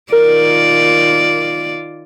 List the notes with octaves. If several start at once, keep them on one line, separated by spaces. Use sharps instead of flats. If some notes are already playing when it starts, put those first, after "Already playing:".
D#3 F4 A#4 D5